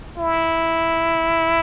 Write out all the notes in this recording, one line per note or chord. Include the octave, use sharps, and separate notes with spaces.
E4